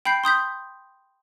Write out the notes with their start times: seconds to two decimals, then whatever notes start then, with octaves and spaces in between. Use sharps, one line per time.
0.05 G5 B5 G6 C7
0.24 C6 D#6 G6 B6